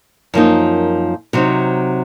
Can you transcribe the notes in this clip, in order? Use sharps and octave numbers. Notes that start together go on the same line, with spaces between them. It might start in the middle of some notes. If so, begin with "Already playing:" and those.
F#2 F3 A#3 D#4
C3 F#3 C4 D#4